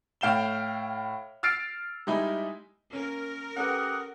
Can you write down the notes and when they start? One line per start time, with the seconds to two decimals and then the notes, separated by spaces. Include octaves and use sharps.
0.21 A2 F5 G5 E7 G7
1.43 E6 F6 A6 C7 D7
2.07 G3 G#3 D#4 E4
2.93 A#3 C#4 A#4
3.56 C#4 G4 A4 B4 F#5 D#6